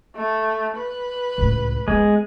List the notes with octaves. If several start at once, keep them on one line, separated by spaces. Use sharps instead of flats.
A3
B4
C#2 A2
G#3 A#3 B3